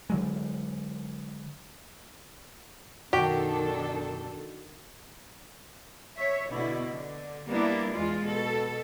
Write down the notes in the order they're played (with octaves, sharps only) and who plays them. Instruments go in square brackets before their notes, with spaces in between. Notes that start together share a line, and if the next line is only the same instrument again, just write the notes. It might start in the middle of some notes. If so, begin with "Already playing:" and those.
[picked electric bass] D3 F#3 G#3
[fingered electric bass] F#2 B2 [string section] D#3 D4 A4 [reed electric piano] F#4 [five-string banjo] G4
[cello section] C#5 E5
B2 D3 E4
D3
G3 A#3 B3 D4 E4
E2 G#3 F4
B2 A4